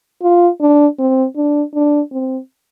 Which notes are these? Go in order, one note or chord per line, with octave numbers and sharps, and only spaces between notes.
F4
D4
C4
D4
D4
C4